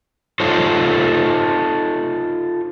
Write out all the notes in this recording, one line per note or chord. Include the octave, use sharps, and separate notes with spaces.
D#4 F4 A4 C5 C#5